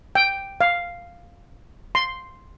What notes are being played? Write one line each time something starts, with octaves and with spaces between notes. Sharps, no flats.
G5
F5
C6